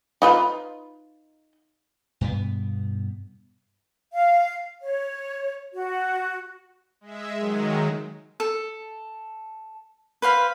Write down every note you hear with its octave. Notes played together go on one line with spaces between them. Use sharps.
D#4 F4 B4
G2 B2 B3
F5
C#5
F#4
G#3 E5
D#3 F#3 G#3
A4
B4 C5 F5 B5